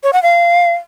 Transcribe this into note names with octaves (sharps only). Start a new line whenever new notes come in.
C#5
F#5
F5